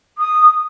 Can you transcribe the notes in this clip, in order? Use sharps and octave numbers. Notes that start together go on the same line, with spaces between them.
D#6